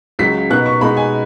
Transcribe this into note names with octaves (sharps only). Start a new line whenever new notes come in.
C#2 C#3 F#3 B6
B2 B3 D#4 F#6
C#6
B2 G#3 B3 D#4 B5
G#5